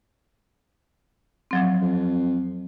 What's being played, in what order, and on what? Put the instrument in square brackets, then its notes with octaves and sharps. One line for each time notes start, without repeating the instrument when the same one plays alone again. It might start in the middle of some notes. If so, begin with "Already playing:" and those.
[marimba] F3 F#3 C4
[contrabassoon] F2